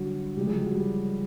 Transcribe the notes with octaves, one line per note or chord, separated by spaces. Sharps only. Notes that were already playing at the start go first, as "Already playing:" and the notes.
Already playing: D3 F#3 G3 F#4
C#3 F3 G3 G#3 G4
G#3 G#4
G3 G4
F#3 F#4
G3 G4